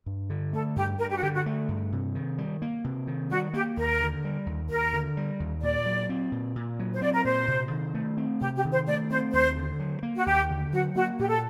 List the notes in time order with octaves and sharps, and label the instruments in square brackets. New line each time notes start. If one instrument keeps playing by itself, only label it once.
[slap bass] G2
D3
[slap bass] A3 [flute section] A4
[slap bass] G2 [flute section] G4
[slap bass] G2 [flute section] A#4
[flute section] G4
F#4
[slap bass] D3 [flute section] G4
[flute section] F#4
[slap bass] A3
G2
C3
D#3
G3
A#3
C3
D#3
[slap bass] G3 [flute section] F#4
[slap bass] A#3 [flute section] G4
[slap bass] D#2 [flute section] A#4
[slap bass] D3
G3
D#2
[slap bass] D#2 [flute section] A#4
[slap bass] D3
G3
D#2
[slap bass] A#2 [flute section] D5
[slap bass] F#3
C4
A#2
A#2
F#3
[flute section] C5
[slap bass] C4 [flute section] D5
[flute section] A#4
[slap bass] A#2 [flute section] C5
[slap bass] C3
D#3
A3
C4
[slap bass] C3 [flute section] G4
[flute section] G4
[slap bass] D#3
[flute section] C5
[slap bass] A3 [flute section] D5
[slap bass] C4 [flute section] C5
[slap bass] D#2 [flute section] C5
[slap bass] D3
F#3
A#3
[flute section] F#4
[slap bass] D#2 [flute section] G4
[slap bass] D3
[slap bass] F#3 [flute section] F#4
[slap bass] A#3 [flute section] F#4
[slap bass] A#2 [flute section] G4
[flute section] A4